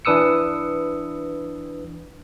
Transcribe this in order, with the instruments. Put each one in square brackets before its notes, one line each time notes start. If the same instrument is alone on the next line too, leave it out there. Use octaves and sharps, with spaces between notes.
[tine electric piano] E3 D4 B4 D#6 E6 C#7